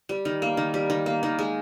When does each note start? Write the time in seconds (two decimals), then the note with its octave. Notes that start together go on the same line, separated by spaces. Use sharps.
0.09 G3
0.25 D#3
0.42 A#3
0.57 D#3
0.74 G3
0.90 D#3
1.06 A#3
1.23 D#3
1.39 G#3